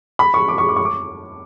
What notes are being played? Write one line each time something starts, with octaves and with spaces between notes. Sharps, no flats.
B5
C#6
D6
C#6
D6
C#6
D6